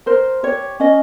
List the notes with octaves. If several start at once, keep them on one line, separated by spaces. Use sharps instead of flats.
A#4 C5
G4 C#5
C#4 D#5